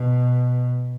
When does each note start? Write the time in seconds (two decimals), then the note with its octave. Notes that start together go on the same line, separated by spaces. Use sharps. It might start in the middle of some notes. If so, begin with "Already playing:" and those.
Already playing: B2